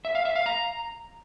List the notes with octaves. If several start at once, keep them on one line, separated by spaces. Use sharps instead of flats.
E5
F5
E5
F5
A#5